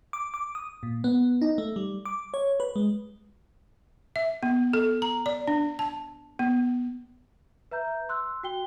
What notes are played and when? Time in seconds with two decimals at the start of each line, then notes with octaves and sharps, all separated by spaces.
0.13 D6
0.34 D6
0.55 D#6
0.83 A#2
1.04 B3
1.41 D#4
1.58 A3
1.76 G3
2.05 D6
2.34 C#5
2.60 B4
2.76 G#3
4.16 E5
4.43 B3
4.73 A4
5.02 A#5
5.26 D5
5.47 D4
5.79 A5
6.39 B3
7.71 B4 E5 A#5 G6
8.09 C6 E6 F#6
8.43 F#4 G5 G7